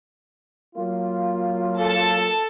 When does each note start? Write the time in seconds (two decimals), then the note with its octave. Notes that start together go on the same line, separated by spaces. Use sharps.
0.76 F#3 A#3 F4
1.79 A4 A5